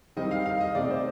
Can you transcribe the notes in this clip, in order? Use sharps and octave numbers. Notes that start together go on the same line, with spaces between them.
D#3 G3 C4 D#4 D#5
F5
F5
D#5
C3 D#3 A3 C4 D#4 D5
C5